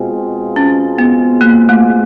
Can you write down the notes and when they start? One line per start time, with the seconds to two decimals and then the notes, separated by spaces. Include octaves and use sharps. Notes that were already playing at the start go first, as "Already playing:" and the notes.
Already playing: B2 G#3 C4 F4 G#4
0.56 C#4
0.98 B3
1.41 A#3
1.69 A3